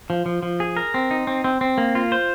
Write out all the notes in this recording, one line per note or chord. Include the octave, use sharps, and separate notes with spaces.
F3
F3
F3
G#4
A#4
C4
D#4
C4
C4
C4
A#3
F4
C5